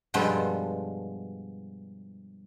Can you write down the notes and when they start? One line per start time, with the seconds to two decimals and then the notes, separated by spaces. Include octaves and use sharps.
0.14 G2 B2 F3 G3 G#3 A4